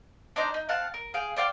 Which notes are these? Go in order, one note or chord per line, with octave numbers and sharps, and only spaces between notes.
D4 D#4 C5 A#5
D#4
C4 F5 F#5 A5
A#4
G#4 F5 G5
C5 D5 F5 G5